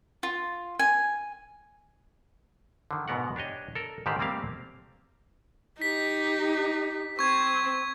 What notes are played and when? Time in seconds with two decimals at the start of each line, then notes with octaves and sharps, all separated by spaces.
0.23 F4
0.79 G#5
2.91 D3 D#3
3.08 G#2 B2 B3 A#4 F#5
3.36 D4 G4 C#5 D#5
3.75 A4 A#4
4.06 G#2 D3 D#3 G4 C5 D5
4.19 G3 A3 A#3 C4 G4 F5
5.82 D#4 G4 B6
7.19 C4 C#6 G#6